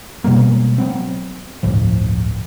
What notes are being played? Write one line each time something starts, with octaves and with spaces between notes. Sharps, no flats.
B2 G3 G#3 A#3
F#3 B3 C4
D1 G1 A2 F3